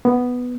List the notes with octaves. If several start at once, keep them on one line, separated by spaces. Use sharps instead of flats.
B3